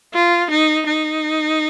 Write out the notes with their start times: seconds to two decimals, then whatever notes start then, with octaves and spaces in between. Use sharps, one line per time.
0.14 F4
0.51 D#4
0.87 D#4